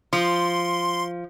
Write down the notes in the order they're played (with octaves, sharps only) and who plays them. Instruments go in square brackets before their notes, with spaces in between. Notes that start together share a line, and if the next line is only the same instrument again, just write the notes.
[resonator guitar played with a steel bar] F3 [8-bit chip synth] C6